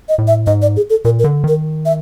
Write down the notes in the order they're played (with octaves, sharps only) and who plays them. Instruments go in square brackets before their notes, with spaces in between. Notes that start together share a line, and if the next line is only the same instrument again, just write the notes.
[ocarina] D#5
[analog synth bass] A2
[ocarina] E5
[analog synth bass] G#2 [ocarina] D#5
[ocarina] D5
G#4
A4
[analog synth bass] A#2 [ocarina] A#4
[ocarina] A#4
[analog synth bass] D3
[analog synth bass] D#3 [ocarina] A#4
[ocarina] E5